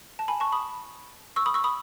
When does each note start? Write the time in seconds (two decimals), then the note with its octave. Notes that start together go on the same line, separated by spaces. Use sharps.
0.19 A5
0.28 G#5 B5
0.40 A5 C#6
0.52 B5 D#6
1.36 C#6 E6
1.46 B5 D#6
1.54 C#6 E6
1.64 B5 D#6